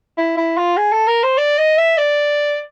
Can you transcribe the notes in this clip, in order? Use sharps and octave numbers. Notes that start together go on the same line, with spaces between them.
E4
E4
F4
G#4
A4
A#4
C5
D5
D#5
E5
D5